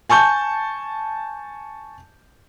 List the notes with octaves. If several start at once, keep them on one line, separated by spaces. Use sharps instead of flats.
G#5 A5 C#6 G6